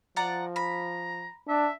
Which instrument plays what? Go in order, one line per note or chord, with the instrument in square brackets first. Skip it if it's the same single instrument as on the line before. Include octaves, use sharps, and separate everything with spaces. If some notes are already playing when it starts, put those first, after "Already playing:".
[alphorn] F3 [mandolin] D5 F#5 A#5
[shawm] A#5 [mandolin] B5
[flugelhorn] D4 [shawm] E5